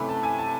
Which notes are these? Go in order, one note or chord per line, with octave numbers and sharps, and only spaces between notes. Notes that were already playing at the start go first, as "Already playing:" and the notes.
Already playing: C3 E3 A3 C#4 B5
A5
G#5
A5